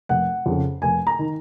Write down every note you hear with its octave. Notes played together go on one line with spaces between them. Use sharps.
F1 F#5
F2 C#3
F1 G#5
A#5
D#3